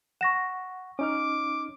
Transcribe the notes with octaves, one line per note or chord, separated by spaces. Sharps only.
F#5 C#6 A#6 E7
C#4 D#4 D6 F6